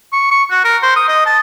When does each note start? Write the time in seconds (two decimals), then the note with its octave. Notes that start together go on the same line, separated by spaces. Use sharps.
0.13 C#6
0.31 C#6
0.50 F#4
0.65 A#4
0.83 C5
0.96 D#6
1.08 D#5
1.26 A5